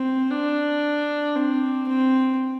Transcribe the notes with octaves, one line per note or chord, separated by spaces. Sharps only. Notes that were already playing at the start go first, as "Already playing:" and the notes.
Already playing: C4
D4
C4
C4